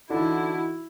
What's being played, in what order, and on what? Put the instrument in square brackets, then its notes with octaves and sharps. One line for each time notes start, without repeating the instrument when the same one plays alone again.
[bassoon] D3 [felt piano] E3 D#4 [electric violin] E4 [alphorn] F#4